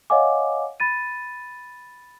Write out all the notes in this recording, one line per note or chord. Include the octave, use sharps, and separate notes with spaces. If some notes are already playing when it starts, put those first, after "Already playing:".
C#5 D#5 F5 F#5 G#5 D6
B5 A6 D#7